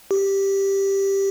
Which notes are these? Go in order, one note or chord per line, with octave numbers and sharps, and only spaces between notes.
G4